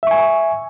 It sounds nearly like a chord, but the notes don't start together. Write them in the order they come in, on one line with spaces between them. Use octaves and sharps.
E5 C#6 G#5